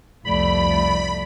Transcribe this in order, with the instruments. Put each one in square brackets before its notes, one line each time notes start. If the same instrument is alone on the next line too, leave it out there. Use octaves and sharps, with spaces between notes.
[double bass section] F1 C2 A3 [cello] F3 D5 [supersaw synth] B5